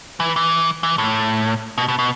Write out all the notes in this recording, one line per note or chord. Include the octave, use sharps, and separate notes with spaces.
E3
E3
E3
A2
B2
B2
B2